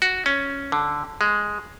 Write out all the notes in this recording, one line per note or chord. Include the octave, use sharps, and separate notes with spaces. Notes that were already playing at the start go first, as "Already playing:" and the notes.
F#4
C#4
D3
G#3